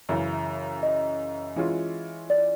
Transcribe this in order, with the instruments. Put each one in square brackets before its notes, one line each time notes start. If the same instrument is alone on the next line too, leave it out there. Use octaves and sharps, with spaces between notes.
[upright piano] F#2 C#3 E3
[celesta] D#5
[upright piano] E3 G#3 C#4 F4
[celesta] D5